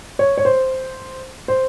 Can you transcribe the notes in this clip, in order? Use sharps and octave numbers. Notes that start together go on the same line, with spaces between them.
C#5
C#5
C5
C5